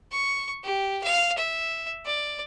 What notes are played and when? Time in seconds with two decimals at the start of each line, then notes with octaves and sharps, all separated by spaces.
0.11 C#6
0.64 G4
1.03 F5
1.37 E5
2.05 D5